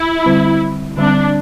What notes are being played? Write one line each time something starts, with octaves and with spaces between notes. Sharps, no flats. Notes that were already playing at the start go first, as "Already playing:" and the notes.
Already playing: E4
D3 G3 C4
D3 G3 C4 D4